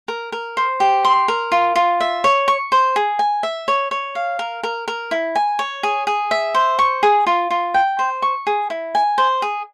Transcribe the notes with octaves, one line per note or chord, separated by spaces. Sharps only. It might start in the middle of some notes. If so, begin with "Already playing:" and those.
A#4
A#4
C5
G4
C6
A#4
F4
F4
E5
C#5
C#6
C5
G#4
G#5
E5
C#5
C#5
F5
A#4
A#4
A#4
E4
G#5
C#5
G#4
G#4
E5
C5
C#6
G#4
F4
F4
G5
C5
C#6
G#4
E4
G#5
C5
G#4